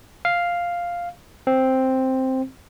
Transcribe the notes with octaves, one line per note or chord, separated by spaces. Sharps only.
F5
C4